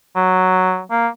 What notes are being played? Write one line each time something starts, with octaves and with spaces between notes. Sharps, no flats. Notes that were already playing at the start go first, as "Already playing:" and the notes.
F#3
A#3